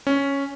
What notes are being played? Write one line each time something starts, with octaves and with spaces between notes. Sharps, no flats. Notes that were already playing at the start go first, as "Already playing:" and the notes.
C#4